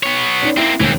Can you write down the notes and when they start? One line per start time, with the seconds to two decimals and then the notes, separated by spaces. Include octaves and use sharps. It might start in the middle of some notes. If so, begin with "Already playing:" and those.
0.03 B3 C#5
0.42 C#4 D#4 D5
0.57 A#3 C4 E4
0.80 E1 D#2 E3 C4 D7